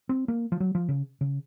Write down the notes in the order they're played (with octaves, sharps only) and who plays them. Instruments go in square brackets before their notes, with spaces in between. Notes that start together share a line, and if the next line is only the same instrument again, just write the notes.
[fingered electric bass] C4
A#3
F3
F#3
F3
C#3
C#3